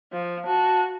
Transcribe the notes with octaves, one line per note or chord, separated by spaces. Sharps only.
F3
F#4 A5